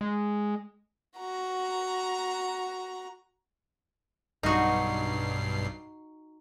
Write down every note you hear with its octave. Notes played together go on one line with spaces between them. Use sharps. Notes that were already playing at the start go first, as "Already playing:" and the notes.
G#3
F#4 A#5
B1 G2 D#4 F#4 C7